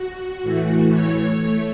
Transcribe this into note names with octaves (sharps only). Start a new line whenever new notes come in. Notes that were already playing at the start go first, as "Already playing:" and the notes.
Already playing: F#4
A2 E3 A3
C#5
A3